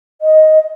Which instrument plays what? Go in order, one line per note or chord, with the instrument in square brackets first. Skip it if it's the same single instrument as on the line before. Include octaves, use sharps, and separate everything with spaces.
[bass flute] D#5